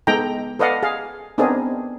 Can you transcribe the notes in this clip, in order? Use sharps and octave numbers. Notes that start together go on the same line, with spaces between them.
G#3 B3 D#4 A4 G5 A#5
A4 B4 D5 D#5 F5 F#5
G#4 F5
B3 C4 D4 D#4 G#4 A#4